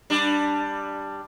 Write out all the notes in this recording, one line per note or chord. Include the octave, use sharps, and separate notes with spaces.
G3 D4